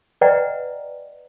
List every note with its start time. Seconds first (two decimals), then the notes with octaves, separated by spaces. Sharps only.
0.21 B4 D5 D#5 F#5 G5 A#5